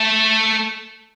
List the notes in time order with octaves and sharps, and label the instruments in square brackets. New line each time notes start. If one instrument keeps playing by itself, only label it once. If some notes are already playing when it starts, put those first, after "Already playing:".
Already playing: [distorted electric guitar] A3